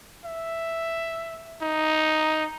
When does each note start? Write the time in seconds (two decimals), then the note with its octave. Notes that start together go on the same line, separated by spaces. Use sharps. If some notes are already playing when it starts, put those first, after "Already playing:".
0.25 E5
1.62 D#4